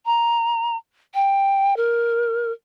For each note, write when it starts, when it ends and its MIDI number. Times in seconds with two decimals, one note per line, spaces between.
0.06 0.77 82
1.14 1.76 79
1.77 2.52 70